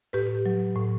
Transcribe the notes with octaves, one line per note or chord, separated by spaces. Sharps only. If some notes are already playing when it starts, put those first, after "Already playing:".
A2 G4 B4
F#3
A2